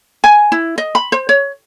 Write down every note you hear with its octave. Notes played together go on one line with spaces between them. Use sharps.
G#5
E4
D#5
B5
C5
C#5